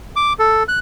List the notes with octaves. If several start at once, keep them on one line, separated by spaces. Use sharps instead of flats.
D6
A4
F#6